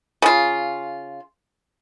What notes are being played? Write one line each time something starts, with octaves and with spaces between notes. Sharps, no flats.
C#3 F4